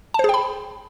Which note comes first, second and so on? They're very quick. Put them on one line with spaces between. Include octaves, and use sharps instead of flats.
A5 C5 G#4 G5 B5